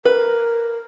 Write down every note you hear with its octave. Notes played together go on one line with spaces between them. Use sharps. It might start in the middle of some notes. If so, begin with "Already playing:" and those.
A#4 B4